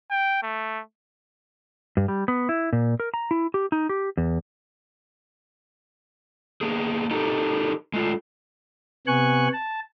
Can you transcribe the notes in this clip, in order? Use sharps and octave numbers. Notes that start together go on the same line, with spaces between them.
G5
A3
G2
G3
B3
E4
A#2
A#4
A#5
E4
G4
D#4
G4
E2
A#3 B3 G#4
D#4 G4 A4 A#4
G#3 A3 F4
C3 B3 G#5 C#6 F#6
A5